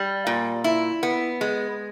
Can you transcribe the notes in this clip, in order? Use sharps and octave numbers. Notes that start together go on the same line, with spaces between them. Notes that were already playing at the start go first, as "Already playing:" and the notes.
Already playing: G3
A#2
E4
B3
G#3